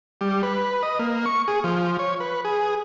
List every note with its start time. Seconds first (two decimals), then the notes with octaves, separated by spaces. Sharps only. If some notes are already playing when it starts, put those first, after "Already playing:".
0.21 G3
0.43 B4
0.83 D#5
0.99 A#3
1.26 C#6
1.48 G#4
1.64 F3
1.99 C#5
2.20 B4
2.45 G#4